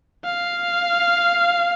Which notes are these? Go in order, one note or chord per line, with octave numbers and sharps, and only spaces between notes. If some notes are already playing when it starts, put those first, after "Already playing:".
F5